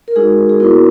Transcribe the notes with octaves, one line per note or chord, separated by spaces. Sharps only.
A#4
G#3 D#4 F#4 G#4
G#4
B3 E4 F#4 A#4